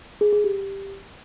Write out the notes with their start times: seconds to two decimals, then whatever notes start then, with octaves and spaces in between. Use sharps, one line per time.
0.21 G#4
0.33 G#4
0.44 G4